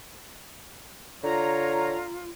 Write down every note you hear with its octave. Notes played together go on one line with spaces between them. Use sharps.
D3 F4 C#5 A#5